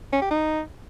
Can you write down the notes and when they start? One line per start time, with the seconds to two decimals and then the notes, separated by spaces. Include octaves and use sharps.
0.13 C#4
0.22 G4
0.31 D#4